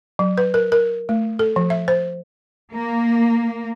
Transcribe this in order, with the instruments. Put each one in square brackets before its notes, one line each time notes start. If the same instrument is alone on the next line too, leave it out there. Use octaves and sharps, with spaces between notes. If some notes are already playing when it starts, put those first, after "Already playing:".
[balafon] F#3
B4
A#4
A#4
A3
A4
F3
E5
C5
[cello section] A#3